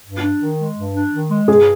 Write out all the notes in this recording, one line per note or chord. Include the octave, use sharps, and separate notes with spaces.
G2
D4
D#3
G#3
G2
D4
D#3
G#3
G2 G#4